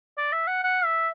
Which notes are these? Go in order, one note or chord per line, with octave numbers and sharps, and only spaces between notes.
D5
E5
F#5
F#5
E5